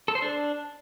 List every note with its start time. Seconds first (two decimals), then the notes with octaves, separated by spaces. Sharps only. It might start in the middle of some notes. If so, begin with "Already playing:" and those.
0.08 A4
0.15 C5
0.22 D4